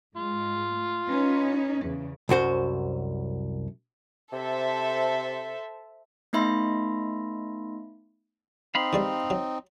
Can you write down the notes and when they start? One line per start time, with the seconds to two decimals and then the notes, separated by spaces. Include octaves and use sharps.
0.16 G#2 G#3 F4
0.73 A3
1.08 C#4 D#4 B4
1.85 E2 C#3
2.29 C2 F#2 F#4 C5
4.33 C3 A4 C5 E5
6.33 A3 B3 D#4 E5 B5 C6
8.75 C4 D#4 F5 B5 C6
8.93 E3 G3 G#3
9.30 F#3